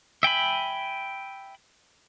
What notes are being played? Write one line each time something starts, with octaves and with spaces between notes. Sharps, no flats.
E5 G5 G#5 B5